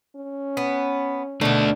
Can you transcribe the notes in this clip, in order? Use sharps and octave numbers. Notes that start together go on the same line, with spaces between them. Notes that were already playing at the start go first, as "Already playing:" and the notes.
C#4
B3
B2 D#3 A3 D4